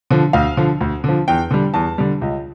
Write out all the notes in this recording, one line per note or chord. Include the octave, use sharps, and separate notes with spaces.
D3 F3
D2 F5
D3 F3
D2
D3 F3
E2 G5
D3 G3
E2 A5
D3 G3
C#2